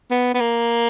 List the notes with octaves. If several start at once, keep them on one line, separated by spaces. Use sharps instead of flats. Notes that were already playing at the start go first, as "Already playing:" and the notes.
B3
B3
A#3